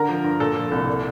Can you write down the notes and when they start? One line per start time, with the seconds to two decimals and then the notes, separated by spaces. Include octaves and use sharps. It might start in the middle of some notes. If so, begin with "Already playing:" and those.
Already playing: D3 A#4
0.09 F3
0.24 G2
0.40 A#2 A4
0.56 F3
0.71 C2
0.87 A#2